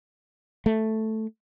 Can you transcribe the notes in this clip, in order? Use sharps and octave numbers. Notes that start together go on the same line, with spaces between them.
A3